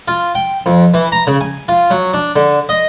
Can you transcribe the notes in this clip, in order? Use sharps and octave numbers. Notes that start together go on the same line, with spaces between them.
F4
G5
F2
E3
A#5
C#3
G#5
F4
F#3
D4
D3
D#5